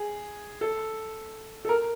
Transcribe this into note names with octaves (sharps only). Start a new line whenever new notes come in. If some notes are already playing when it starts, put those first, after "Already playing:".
Already playing: G#4
A4
A4
A#4